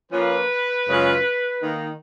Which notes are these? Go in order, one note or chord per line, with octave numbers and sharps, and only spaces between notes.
F3 A#3 C#4 F4 B4
F#2 C#3 G#3 C#4 F4
D#3 A#3 D#4